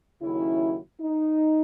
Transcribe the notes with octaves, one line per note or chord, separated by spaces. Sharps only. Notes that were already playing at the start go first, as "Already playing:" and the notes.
D#2 C#3 F#3 C#4 E4
D#4